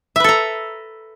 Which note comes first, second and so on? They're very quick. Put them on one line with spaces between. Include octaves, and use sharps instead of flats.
E5 B4 A4 A#5